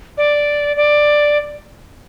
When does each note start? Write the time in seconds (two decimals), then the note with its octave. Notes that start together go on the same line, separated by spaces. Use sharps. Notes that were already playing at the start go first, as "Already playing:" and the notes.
0.18 D5
0.77 D5